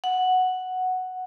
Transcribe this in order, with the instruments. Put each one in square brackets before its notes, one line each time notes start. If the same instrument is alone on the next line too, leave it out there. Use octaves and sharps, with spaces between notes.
[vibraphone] F#5